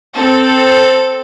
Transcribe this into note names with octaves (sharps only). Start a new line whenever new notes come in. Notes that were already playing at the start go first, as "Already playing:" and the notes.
C4 A4